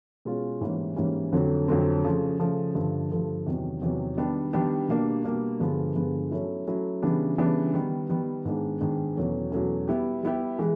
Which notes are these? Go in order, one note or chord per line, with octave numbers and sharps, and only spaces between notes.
B2 G#3 C#4 F4
G#2 E3 G3 A#3 C#4
G#2 E3 G3 A#3 C#4
F2 D3 F#3 A3 C4
F2 D3 F#3 A3 C4
C#3 F3 A3
C#3 F3 A3
G2 D3 F3 A3
G2 D3 F3 A3
E2 C3 D#3 F#3
E2 C3 D#3 F#3
D#3 G3 B3 D4 G4
D#3 G3 B3 D4 G4
B2 G3 A#3 D4
B2 G3 A#3 D4
G2 D3 F3 G#3 B3
G2 D3 F3 G#3 B3
F#3 A3 C#4 E4
F#3 A3 C#4 E4
C#3 E3 G3 B3 D4
C#3 E3 G3 B3 D4
D#3 G3 B3
D#3 G3 B3
G#2 D#3 G#3 B3 D4
G#2 D#3 G#3 B3 D4
E2 B2 F#3 A3 C#4
E2 B2 F#3 A3 C#4
G3 B3 E4 G4
G3 B3 E4 G4
E3 G#3